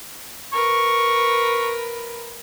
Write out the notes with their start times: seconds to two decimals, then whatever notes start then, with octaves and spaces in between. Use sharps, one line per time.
0.53 A#4 B4 C#6